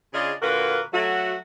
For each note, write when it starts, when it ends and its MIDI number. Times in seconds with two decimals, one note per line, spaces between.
0.14 0.32 49
0.14 0.32 62
0.14 0.32 65
0.14 0.32 68
0.14 0.32 75
0.42 0.80 46
0.42 0.80 50
0.42 0.80 58
0.42 0.80 66
0.42 0.80 70
0.42 0.80 71
0.93 1.35 54
0.93 1.35 57
0.93 1.35 66